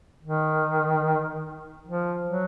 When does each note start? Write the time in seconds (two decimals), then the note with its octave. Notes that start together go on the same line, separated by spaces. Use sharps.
0.23 D#3
1.86 F3
2.27 F#3